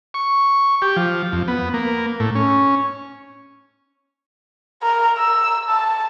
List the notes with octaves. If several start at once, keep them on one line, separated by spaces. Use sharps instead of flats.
C#6
G4
F3
F2
B3
A#3
A2
C#4
A#4
E6
A5